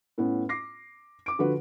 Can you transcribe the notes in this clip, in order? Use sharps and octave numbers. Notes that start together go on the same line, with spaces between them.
A2 B3 C#4
D6 A#6 C7
D6 D7
D3 F3 F4 F#4 B4